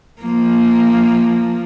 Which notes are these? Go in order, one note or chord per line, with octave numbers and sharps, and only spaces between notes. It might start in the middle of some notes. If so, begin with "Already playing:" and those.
F3 A#3